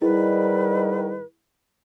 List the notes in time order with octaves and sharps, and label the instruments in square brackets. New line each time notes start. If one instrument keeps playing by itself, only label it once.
[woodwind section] G#2 D#3 G3 [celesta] E4 G#4 [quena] B4